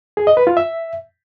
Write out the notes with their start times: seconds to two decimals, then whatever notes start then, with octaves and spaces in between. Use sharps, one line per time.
0.17 G#4
0.27 D#5
0.37 B4
0.47 F4
0.57 E5